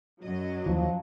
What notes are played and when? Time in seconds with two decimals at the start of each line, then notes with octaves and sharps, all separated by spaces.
0.23 F#2 F#3 D#5
0.66 D#2 E3 F3